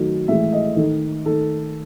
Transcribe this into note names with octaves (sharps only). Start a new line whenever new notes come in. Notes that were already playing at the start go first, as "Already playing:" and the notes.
Already playing: D#3 F#3 A3
A2 E3 G#3 E5
D#5
D#3 A3
D#3 A3 A4